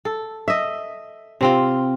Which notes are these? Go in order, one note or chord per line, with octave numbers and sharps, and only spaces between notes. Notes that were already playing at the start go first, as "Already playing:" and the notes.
A4
D#5 E5
C3 C4 F4